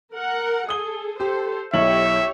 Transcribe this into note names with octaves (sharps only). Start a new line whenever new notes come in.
A#4 F#5
G#4 A4 D#6 G7
G4 A4 C5
B1 E4 G4 C#5 E5 F#7